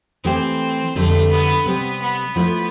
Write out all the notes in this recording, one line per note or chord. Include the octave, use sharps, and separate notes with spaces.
E3 A3 C4 E4 G4
F2 D3 G3 A3
B3
C3 G3 B3 C4
B3
F3 A3 B3 E4